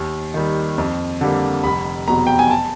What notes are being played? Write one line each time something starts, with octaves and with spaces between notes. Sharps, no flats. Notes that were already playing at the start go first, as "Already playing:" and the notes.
Already playing: D#2
D#3 G3
F2
D3 G3 A#3
F1 B5
E2 B2 F#3 A#5
G5
G#5
A5